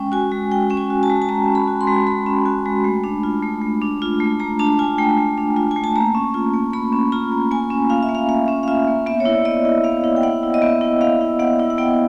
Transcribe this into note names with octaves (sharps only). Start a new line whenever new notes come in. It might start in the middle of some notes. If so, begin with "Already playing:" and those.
Already playing: G#3 C#4 G5
F#4 G#5
G#3
G#3 G5
C#4 G5
G#5
F#4
A5
G#3
A5
G#3 A#5
C#4
B5
F#4
C6
G#3
G#3 B5
C#4
F#4
G#3
A3
D4
F4
A3
A3
D4
F4
A3
A3 A#5
D4 A5
F4 G#5
A3 G5
A3
D4
F4
A3 G#5
A5
A#3 A#5
C#4
F4
A#3
A#3 B5
C#4
F4 A#5
A#3
A#3 G#5
C#4
F4 F5
E5
A#3
F5
A#3 F5
C#4
F5
F4 E5
A#3
B3 E5
C#5
E4
D5
B3 D#5
E4
B3 F5
E4
G5
B3 F#5
E4
D#5
B3 E5
E4
B3 F5
E4
B3 F#5
E4
F#5
B3 G5